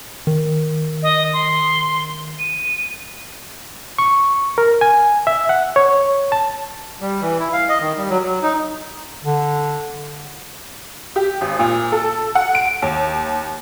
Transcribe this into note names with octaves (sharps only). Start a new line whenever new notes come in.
D#3
D#5
C6
D#7
C#6
A#4
G#5
E5
F#5
C#5
A5
G3
E3
E4
F5
D#5
D#3
G3
F#3
F#3
D#4
D3
G4
G#1
A#2
A4
F#5
D7
D#2